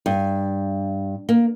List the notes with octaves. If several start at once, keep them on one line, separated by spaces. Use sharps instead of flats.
G2
A#3